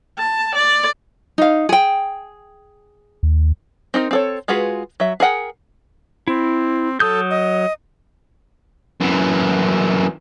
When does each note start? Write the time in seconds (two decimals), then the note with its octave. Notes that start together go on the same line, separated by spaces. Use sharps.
0.19 A5
0.55 D5
1.38 D#4 F5
1.69 G#4 G5
3.23 D#2
3.94 C4 D#4 A#4
4.11 C4 A4 C#5
4.48 G#3 F4 F#4 G#4 B4
5.00 F#3 E5
5.20 G#4 A#4 F#5 G5
6.28 C4 E4
7.00 F#3 A4 D#6 G6
7.31 D#5
9.01 F#2 E3